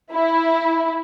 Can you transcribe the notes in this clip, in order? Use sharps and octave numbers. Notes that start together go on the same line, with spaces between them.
E4